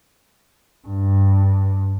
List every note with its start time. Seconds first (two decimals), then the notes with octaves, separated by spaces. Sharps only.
0.88 G2